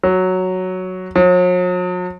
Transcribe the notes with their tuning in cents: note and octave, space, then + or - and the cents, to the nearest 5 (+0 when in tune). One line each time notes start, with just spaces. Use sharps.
F#3 +0
F#3 -45